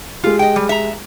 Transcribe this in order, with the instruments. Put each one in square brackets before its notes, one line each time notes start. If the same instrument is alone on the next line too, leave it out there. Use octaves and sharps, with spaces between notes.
[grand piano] G#3 G4 [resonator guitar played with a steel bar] F4
[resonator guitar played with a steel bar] D#5 G5
G3
E5 A#5